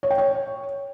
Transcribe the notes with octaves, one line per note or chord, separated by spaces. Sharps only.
C#5
G5
C#5